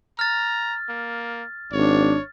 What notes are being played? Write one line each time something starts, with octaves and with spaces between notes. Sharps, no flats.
A#5 F6 A6
A#3
G#1 D4 C#5